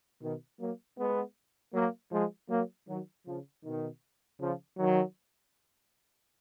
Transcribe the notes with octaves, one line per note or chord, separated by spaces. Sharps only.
B2 D#3
F#3 A#3
G#3 B3
F#3 A#3
F3 G#3
F#3 A#3
D#3 F#3
C#3 F3
B2 D#3
C#3 F3
D#3 F#3